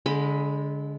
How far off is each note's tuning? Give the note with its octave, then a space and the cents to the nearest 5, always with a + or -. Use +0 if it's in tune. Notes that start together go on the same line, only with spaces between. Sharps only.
D3 -30 G#3 +5 B5 +0